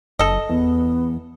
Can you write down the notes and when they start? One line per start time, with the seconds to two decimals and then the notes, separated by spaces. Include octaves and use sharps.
0.19 F#1 A4 D#5
0.49 E2 B3